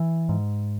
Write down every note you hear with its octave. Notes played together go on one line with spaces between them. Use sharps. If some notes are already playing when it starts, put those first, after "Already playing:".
Already playing: E3
G#2